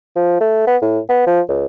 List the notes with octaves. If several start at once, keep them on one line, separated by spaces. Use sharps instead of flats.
F3
A3
B3
A2
B3
F3
C#2